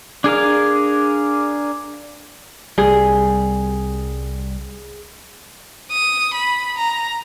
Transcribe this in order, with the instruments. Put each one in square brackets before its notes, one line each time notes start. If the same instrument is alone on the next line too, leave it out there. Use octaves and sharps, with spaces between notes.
[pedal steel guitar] D4 G#4 A#4 F5
[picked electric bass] C2 G3 [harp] G#4
[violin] D#6
B5
A#5